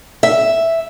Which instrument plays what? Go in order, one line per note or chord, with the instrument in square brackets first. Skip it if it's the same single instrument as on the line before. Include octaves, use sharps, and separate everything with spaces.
[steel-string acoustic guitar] E5